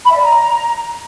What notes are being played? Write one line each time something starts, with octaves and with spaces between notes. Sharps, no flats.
B5
E5
D5
A#5